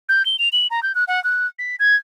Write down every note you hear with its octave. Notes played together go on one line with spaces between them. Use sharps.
G6
G7
F7
F#7
A#5
G6
F#6
F#5
F#6
B6
G#6